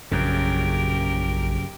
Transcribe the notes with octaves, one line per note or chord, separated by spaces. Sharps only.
A#1 F#2 C#3 G4 A#4